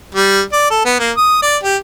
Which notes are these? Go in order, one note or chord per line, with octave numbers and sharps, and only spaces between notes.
G3
D5
A4
B3
A#3
D#6
D5
G4